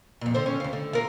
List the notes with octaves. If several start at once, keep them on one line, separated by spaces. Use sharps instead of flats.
F2 A#2
D3 C5
C#4
D2 F5
D3
F4 A#4